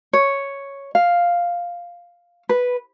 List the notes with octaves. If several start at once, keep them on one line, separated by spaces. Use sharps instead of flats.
C#5
F5
B4